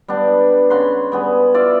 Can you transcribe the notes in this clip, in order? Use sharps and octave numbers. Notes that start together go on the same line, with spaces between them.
G3 B3 D4
C#3 F#5 B5 C6
G3 B3 G#4
F4 D5 E5 F5